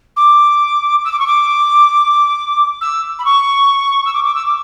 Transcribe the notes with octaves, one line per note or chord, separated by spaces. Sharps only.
D6
E6
D6
C#6
D6
E6
B5
C#6
E6
D6
D6
E6
D6